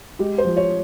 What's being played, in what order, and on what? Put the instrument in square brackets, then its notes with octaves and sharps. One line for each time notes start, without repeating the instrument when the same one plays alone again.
[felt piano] G#3 G4
C5
F3
C#5